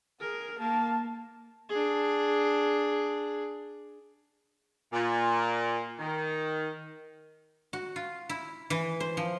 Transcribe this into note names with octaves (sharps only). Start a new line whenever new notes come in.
G#4 A#4
A#3 A5
D4 G#4
A#2
D#3
F#4
F4
E4
E3
C5
F3